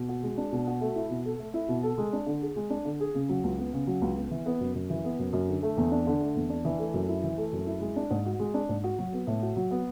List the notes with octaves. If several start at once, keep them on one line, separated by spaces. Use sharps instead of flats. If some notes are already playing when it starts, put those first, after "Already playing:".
Already playing: B2
F#4
G#3
D4
B2
F#4
A3
E4
B2
A4
A3
E4
B2
A4
G#3
D4
D3
G#4
G#3
D4
D3
G#4
C#3
F#3
C#2
B3
C#3
F#3
C#2
B3
E3
B3
F#2
F#2
E3
B3
F#2
F#2
D3
A3
E2
D4
D3
A3
E2
D4
E3
A3
F#2
E4
E3
A3
F#2
E4
G#3
D4
G#2
F#4
G#3
D4
G#2
F#4
F#3
B3
A2
F#4
F#3
B3